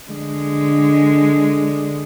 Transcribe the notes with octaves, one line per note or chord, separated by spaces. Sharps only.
D3 G#3